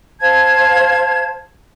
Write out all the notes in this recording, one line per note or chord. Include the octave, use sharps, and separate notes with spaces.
C5 F5 A5 G#6